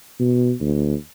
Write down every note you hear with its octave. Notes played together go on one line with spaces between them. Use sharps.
B2
D2